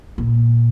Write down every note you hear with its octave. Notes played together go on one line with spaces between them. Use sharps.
A#2